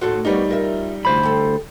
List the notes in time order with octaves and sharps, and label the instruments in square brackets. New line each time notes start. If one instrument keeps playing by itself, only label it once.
[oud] D#2 A2 C5 [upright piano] F#4 A4
[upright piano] G3 D#4 [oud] A#3 B3 C#5
[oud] F4 A#4 E5
[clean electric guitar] D2 C5 B5 [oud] E3
[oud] G4 A4